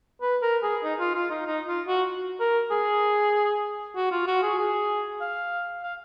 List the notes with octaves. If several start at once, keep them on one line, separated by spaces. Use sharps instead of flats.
B4
A#4
G#4
D#4
F4
F4
D#4
D#4
F4
F#4
A#4
G#4
F#4
F4
F#4
G#4
G#4
F5
F5